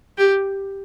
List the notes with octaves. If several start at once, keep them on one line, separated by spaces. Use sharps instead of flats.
G4